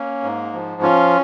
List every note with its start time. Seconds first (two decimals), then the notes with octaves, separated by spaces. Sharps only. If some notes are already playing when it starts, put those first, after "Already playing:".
Already playing: A#3 C#4
0.23 G#2
0.53 F3
0.82 C#4 F4